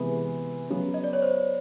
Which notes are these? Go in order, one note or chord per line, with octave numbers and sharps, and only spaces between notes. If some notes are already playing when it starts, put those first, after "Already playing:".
Already playing: C3 E3 G#3 B3 B4
C#3 F#3 B3
D#5
D5
C#5
C5